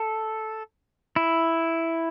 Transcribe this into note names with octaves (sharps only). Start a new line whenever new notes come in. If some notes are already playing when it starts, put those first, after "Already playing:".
Already playing: A4
E4